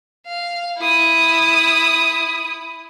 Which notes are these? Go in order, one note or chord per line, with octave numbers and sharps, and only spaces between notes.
F5
E4 D#6